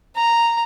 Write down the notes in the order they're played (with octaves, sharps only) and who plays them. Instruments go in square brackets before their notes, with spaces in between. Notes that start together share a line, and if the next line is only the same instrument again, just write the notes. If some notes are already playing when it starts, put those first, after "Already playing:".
[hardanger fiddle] A#5